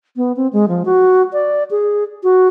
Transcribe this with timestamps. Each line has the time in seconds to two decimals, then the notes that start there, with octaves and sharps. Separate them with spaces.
0.16 B3
0.36 C4
0.53 G#3
0.68 F3
0.85 F#4
1.33 D5
1.71 G#4
2.23 F#4